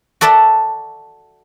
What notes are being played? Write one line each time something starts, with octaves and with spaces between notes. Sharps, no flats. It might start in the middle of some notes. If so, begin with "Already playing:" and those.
F#4 A4 D5 E5 A5